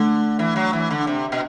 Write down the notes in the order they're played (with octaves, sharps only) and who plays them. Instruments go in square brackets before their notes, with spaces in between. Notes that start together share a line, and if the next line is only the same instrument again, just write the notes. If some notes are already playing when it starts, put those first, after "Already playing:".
Already playing: [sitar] D3 [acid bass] A3
[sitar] E3
F#3
E3
D3
C3
B2